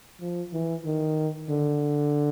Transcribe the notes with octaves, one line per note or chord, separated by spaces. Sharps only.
F3
E3
D#3
D3